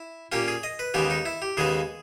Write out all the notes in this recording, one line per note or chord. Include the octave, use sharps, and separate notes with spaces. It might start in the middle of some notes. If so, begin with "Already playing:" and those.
Already playing: E4
A#2 A#3 C#4 G4
G#4
D#5
B4
D#2 C#3 G#3 B3 G4
D#4
E4
G4
D#2 C#3 G#3 B3 G#4